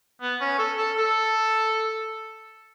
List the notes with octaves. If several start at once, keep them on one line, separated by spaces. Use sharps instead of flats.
B3
C#4
A4
A4
A4